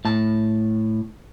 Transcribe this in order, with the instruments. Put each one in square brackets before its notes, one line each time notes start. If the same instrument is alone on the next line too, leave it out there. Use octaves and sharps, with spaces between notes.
[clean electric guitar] A2 A5